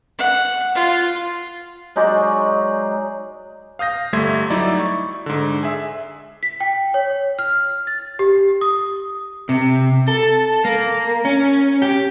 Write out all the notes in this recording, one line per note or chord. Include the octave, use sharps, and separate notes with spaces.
F#5
F4
F#3 G#3 D#4 D5
F5 D#6 G6 A#6
G1 G3 A3 E5 C6 G#6
F#3 D#4 E4 D5
C#6
G#2 D3
G#4 E5
B6
G5
C#5
F6
A6
G4
D#6
C3
A4
A#3
C#4
G4